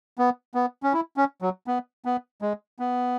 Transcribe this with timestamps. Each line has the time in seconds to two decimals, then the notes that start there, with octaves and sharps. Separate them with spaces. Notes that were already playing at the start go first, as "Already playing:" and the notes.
0.18 B3
0.55 B3
0.83 C#4
0.93 E4
1.17 C#4
1.42 F#3
1.67 B3
2.05 B3
2.42 G#3
2.79 B3